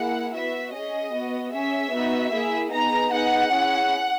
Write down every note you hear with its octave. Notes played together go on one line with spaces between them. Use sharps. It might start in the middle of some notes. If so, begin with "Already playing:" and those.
Already playing: A#3 E4 G#4 F#5
B3 F#4 E5
C#4 G#4 D#5
B3 F#4
C#4 G#4 E5
B3 D#4 F#4
A#3 E4 G#4
B3 D#4 G#4 A#5
B3 D#4 G#4 F#5
C#4 E4 G#4